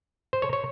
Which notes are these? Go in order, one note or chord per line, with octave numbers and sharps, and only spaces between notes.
C5
C#5
C#5